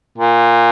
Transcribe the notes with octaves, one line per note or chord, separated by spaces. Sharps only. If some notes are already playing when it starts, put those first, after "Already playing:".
A#2